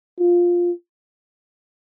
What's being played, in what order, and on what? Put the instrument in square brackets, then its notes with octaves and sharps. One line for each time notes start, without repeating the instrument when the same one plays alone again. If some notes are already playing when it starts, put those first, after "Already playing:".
[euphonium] F4